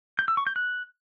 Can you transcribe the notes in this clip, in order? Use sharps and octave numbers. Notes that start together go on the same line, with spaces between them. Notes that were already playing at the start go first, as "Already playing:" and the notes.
G6
E6
C#6
G6
F#6